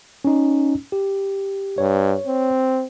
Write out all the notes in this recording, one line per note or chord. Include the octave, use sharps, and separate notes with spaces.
C#4 D#4
G4
G2 C#5
C4